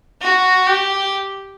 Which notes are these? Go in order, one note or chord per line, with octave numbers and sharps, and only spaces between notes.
F#4
G4